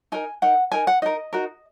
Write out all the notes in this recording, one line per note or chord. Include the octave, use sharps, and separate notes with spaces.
D#4 A#4 G#5
D#4 A#4 F#5
D#4 A#4 G#5
F#5
D#4 A#4 D#5
D#4 F#4 A#4